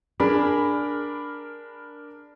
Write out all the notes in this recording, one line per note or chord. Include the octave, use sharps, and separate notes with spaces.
D4 G#4 A#4 B5